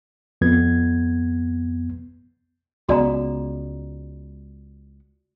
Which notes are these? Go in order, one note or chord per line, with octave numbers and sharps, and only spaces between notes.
F2 B3 G#6
C#2 G#3 B3 F#4 D5 A#5